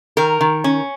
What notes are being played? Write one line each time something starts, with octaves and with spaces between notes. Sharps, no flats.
D#3 A#4
D#3
C#4